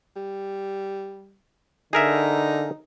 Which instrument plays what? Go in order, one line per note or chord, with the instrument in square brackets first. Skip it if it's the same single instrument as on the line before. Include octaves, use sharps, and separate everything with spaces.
[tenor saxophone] G3
[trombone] D3 [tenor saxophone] D#4 [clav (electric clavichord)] G#4 A#4 E5